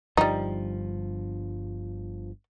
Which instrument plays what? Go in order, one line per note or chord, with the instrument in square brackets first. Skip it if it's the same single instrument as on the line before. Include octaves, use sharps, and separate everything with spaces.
[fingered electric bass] G1 G2 F3 [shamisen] G3 D#4